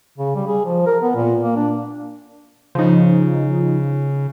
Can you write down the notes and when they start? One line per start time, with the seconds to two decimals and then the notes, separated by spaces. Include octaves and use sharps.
0.18 C#3
0.35 G3
0.47 G#4
0.65 F3
0.87 A#4
1.03 B3
1.15 A#2
1.43 A#3
1.56 D4
2.75 C#3 F3 D#4